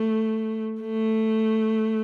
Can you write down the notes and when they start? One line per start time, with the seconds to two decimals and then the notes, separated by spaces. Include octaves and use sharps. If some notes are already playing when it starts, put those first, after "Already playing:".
Already playing: A3
0.82 A3